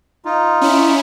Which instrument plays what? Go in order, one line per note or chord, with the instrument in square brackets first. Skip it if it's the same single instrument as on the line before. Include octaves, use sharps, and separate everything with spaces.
[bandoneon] D#4 F4
[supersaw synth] C#4 E4